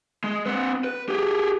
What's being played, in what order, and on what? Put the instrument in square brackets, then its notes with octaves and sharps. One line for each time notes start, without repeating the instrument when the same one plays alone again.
[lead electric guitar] G#3
C4 B4
B4
G4 G#4